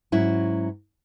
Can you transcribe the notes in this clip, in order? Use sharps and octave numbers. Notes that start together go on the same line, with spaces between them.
G#2 F#3 C#4 E4 F#4